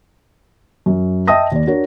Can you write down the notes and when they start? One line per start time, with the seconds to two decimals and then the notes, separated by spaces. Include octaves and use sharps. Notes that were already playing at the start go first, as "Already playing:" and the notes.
0.86 F#2
1.28 D#5 E5 G5 A5 D#6 A#6
1.52 D#2 D5
1.67 D4 F#4 A#4 C#5